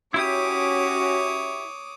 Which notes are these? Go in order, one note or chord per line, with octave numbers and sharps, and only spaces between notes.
C#4 E4 F#4 G4 C#5 D6 D#6